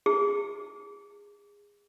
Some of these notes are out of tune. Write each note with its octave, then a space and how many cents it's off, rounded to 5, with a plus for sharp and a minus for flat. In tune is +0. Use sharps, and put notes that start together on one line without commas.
G#4 -20